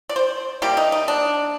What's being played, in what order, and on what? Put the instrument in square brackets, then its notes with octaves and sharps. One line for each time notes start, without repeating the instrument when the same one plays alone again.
[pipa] D5
C5
C3 G3 A#3 G4
D#4
D#4
D4